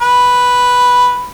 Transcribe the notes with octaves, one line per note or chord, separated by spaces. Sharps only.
B4